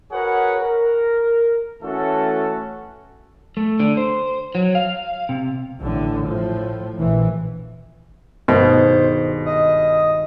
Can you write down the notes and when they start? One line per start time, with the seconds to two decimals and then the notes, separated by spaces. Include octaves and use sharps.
0.12 F#4 G#4 A#4 B4 C#5 F#5
0.60 A#4
1.83 E3 A3 C#4 F#4 A4
3.57 A3
3.80 D3
3.97 C5
4.55 F#3
4.75 F5
5.29 C3
5.79 A1 A2 D3
6.26 A2 F3
6.98 A#1 E3
8.48 G#1 G2 B2 D#3 C5
9.46 D#5